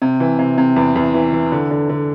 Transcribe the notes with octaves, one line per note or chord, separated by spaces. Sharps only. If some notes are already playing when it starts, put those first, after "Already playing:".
C3
E3
C3
C3
E2
E2
E3
E3
D3
D3
D3